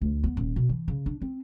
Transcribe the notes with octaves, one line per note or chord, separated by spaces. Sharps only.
D2
B3
D#1
B2
E3
C#3
D4
C4